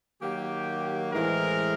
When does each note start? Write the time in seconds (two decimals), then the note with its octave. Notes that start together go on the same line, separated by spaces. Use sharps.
0.21 D#3 F#3 A#3 G4
1.13 A2 E3 G#3 C4 A#4